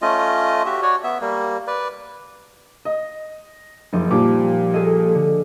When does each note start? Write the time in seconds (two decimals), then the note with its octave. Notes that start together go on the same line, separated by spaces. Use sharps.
0.02 A3 C#4 F4 D#5
0.65 F#4 G4 E5
0.82 F#4 C#5 D5
1.04 B3 E5
1.21 G3 A#3
1.67 B4 D5
2.85 D#5
3.93 F#1 F3 D#4 G4
4.11 A#2 F3 G3 D6
4.74 G#4 A4 D#5
5.15 D3